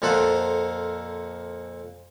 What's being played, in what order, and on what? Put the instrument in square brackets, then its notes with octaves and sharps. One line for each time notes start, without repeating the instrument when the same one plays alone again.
[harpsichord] F2 A#2 A#3 A4 C5 F#5